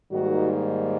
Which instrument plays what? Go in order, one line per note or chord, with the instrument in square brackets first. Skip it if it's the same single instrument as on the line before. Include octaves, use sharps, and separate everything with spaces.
[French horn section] G#2 D#3 G3 A#3 F#4